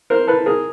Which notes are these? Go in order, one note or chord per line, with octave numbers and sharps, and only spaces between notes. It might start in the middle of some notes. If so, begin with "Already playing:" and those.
A#4 C5
A4 B4
G#4 A#4